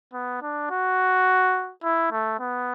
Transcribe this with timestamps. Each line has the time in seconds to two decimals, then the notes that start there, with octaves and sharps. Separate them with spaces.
0.14 B3
0.42 D4
0.71 F#4
1.84 E4
2.12 A3
2.39 B3